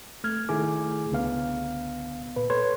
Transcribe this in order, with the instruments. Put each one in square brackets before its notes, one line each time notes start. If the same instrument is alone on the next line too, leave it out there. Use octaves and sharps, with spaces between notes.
[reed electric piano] A3 F6 G#6
D#3 A3 E4 G#4 D6
C#2 D3 B3 F5
A#2 B4
A4 B4 C#5 C6 G#6